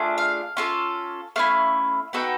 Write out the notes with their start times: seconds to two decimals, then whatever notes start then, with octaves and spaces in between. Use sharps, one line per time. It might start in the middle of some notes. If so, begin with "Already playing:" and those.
Already playing: A3 D4 F4 G#4
0.18 F5
0.57 C#4 F4 A4
1.36 A3 C#4 E4 F5
2.13 B3 D#4 F#4 A4 G5